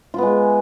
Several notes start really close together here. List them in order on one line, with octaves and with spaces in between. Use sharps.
F4 B3 G#3